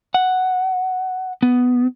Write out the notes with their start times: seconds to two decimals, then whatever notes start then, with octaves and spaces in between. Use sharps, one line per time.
0.14 F#5
1.43 B3